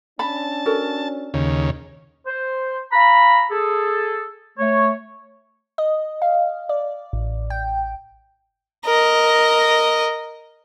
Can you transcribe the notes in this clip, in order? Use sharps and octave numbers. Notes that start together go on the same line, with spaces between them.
C#4 D4 A5 B5
F#4 A4 A#4
D#2 C#3 D#4
C5
F5 A#5 B5
G#4 A4
A3 C#5
D#5
F5
D5
A1
G5
A#4 D#5